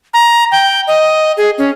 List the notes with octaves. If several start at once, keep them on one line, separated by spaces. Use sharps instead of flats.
A#5
G5
D#5
G#4
C#4